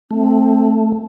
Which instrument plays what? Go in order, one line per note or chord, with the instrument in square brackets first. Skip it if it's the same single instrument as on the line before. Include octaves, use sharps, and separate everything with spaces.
[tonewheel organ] A3 [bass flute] C4